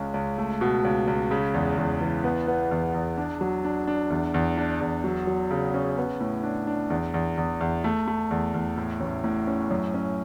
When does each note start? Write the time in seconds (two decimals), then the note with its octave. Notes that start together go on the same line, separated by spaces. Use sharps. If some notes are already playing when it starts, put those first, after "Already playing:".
Already playing: C#2 G#3 C#4
0.14 C#2
0.38 A3
0.61 B2
0.84 C#2
1.07 C#2
1.31 C#3
1.54 E2
1.77 E2
2.01 E3
2.24 B3
2.48 B3
2.71 E2
2.94 E2
3.17 D4
3.41 F#3
3.64 D4
3.87 D4
4.10 E2
4.34 E2
4.58 D4
4.81 E2
5.04 F#3
5.27 F#3
5.51 C#3
5.74 C#4
5.98 B3
6.20 A2
6.43 D4
6.67 D4
6.90 E2
7.14 E2
7.38 E2
7.61 E2
7.84 A3
8.08 A3
8.31 E2
8.54 E2
8.77 A2
9.00 A1
9.24 A2
9.47 C#4
9.71 F#2
9.94 C#4